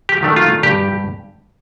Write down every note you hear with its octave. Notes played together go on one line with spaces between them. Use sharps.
G4
D#3 A3 D4
F4
G2 G4